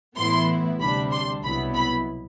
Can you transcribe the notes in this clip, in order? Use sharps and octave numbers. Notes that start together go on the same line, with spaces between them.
A2 E3 B3 E4 C6
D2 C3 G3 D4 B5
C6
C2 B2 F#3 B3 E4 B5
B5